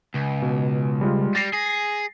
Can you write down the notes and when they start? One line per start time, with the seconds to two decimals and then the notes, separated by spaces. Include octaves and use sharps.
0.14 C#2
0.42 B2
1.01 G3 G#3 F4
1.35 G3 A6 A#6 C7
1.54 G#4